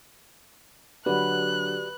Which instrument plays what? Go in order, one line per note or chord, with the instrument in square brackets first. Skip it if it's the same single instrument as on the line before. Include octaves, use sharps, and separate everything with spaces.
[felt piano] D3 F#3 [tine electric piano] F#4 G4 D5 [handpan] B4 [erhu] F#6